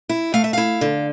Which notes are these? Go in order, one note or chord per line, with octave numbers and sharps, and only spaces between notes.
E4
A3 F5
E5
E4 F5
D3